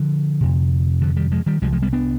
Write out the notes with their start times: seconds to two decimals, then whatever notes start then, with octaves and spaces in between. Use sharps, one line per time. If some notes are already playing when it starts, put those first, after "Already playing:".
Already playing: D3 F3
0.41 F2 C3
1.01 D3 F3
1.16 D#3 G3
1.32 F3 G#3
1.46 D#3 G3
1.62 C2 C3 F3 G#3
1.73 F3 G#3
1.82 G3 B3
1.93 B3 D4